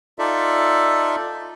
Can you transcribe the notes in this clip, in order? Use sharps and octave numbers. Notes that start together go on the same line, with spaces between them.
D#4 F4 A4 D5 E5